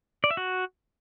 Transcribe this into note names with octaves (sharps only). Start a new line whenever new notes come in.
D5
E5
F#4